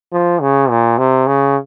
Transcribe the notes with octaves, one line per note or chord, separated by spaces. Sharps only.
F3
C#3
A#2
C3
C#3